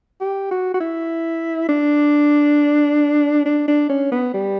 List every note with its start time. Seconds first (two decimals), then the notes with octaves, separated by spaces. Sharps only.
0.21 G4
0.51 F#4
0.74 F#4
0.80 E4
1.69 D4
3.45 D4
3.68 D4
3.89 C#4
4.11 B3
4.34 G3